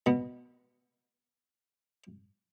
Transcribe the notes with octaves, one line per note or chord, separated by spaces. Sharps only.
B2 B3